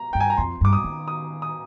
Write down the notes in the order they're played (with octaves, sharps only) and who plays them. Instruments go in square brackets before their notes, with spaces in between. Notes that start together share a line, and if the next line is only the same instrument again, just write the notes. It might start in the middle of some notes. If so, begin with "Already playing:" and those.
Already playing: [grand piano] A#5
[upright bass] G2 [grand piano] G5
[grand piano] G#5
A#5
[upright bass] F2 [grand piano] C6
[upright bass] G2 [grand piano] D6
[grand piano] D#6
[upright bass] D#3
[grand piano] D#6
D#6